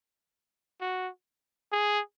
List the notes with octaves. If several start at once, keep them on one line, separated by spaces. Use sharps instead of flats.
F#4
G#4